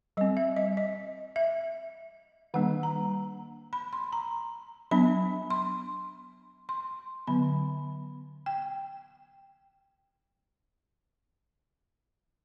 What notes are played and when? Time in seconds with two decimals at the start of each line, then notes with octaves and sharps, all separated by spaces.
0.17 G3 C4 D#5
0.37 E5
0.56 D#5
0.77 D#5
1.36 E5
2.54 D#3 G3 A#3 D4 F#5
2.83 A#5
3.73 B5
3.93 C6
4.12 A#5
4.91 F#3 B3 D4 B5
5.50 C6
6.69 C6
7.27 D3 F#3 B3 B5
8.46 G5